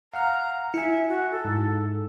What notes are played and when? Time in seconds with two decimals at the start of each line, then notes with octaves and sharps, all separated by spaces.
0.14 F5 F#5 A#5 F6
0.74 E4 E5 G#5 C#7
1.08 F#4
1.31 A4
1.45 G#2